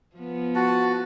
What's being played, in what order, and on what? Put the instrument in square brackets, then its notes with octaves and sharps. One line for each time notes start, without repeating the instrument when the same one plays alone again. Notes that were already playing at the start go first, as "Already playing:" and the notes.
[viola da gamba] F3 B3
[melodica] F#4 [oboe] A5